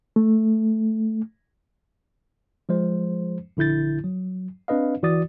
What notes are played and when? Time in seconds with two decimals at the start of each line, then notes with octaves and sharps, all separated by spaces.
0.16 A3
2.69 F3 G#3 C5
3.57 A#1 D3 E4 G6 A6
4.04 F#3
4.68 C4 D4 B4 D#5 F5
5.02 G1 E3 F#4 D5 D#6 A6